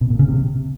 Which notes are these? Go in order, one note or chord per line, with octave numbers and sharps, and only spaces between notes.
B2
A#2
C#3
C3